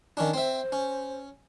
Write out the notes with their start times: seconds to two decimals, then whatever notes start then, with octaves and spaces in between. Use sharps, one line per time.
0.17 D#3 C#4 D4
0.34 C4 C5 E5
0.72 C#4